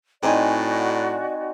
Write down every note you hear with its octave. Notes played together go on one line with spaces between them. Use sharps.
A2 C4 D#4 F#4 D5 G#5